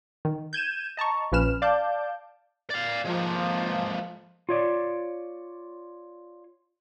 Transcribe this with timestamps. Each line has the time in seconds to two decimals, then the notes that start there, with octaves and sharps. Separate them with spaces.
0.25 D#3
0.53 G6 G#6 D#7 E7
0.97 D#5 A5 A#5 C#6
1.32 A#1 F3 C#4 B4 F6 E7
1.62 D5 F5 A5 D6 G6
2.70 D5 F5
3.05 F3 G#3 A#3
4.49 F4 C#5 D5